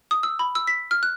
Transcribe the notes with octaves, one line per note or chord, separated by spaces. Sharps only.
D#6
E6
B5
E6
B6
F6
F#6